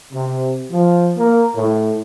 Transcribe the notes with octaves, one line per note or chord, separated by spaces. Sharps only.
C3
F3
A#3
A2